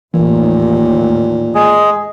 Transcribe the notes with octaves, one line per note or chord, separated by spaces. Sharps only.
A1 D#2 A#2 E3
G#3 G#4